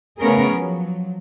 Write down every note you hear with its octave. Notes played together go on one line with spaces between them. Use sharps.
C#3 A3 B3 C#4 G#4 A#4
F3 F#3